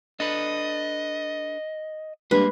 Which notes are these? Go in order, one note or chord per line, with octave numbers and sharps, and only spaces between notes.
D4 A4 B4 D#5
G2 G#3 A#3 B4